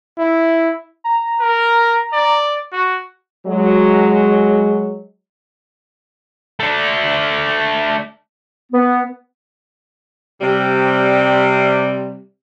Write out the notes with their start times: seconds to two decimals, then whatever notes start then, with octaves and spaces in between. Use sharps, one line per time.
0.19 E4
1.04 A#5
1.41 A#4
2.13 D5
2.73 F#4
3.47 F#3 G#3
6.60 A3 D4
8.72 B3
10.41 C3 G3